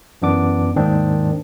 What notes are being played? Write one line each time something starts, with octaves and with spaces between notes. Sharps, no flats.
F#2 E3 B3 D4 D6
D#2 G#2 D#3 A#3 C4 D4